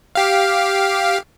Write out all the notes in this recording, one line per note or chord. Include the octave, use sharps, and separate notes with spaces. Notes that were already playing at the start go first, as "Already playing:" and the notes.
G4 F5